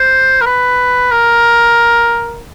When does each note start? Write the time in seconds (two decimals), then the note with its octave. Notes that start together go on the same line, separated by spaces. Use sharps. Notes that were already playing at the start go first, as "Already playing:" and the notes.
Already playing: C5
0.41 A#4
0.46 B4
1.11 A#4